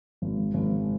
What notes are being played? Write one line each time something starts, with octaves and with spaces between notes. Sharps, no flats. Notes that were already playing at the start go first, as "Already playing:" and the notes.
G#1
G#1